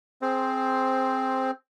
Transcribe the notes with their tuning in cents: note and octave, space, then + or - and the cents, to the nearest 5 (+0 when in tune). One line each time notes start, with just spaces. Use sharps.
C4 +5 G#4 +25 C5 +0